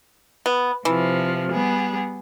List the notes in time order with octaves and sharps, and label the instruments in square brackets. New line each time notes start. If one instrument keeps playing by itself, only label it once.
[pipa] B3
[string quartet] C3 F3 [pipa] E3
[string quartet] G3 B3 G#4